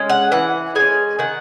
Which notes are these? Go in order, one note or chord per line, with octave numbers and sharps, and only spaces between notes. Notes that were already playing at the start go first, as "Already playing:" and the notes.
Already playing: G#3 C#4
F#5
E3 F#5
G#3 C#4 G#5
D#3 F#5